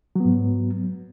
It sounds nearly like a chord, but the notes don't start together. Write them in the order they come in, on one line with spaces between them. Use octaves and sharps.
F#3 B3 G#2